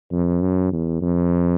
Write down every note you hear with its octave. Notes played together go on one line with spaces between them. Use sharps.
F2
F#2
E2
F2